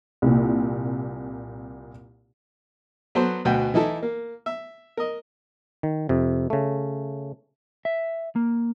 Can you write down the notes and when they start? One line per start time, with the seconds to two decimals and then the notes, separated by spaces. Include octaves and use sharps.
0.22 C2 A#2
3.15 F#3 B3 A4 C5
3.45 D2 B2 F#4 G5
3.74 E3 D#4 E4 A4
4.02 A#3
4.46 E5
4.97 A#4 D#5
5.83 D#3
6.09 F2 C3
6.50 C#3 A3
7.85 E5
8.36 A#3